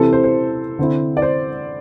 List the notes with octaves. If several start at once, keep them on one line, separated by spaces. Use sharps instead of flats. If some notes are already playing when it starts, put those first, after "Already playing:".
Already playing: C3 E3 C4 E4 A4
C5
C5
D3 C4 E4
D5
C5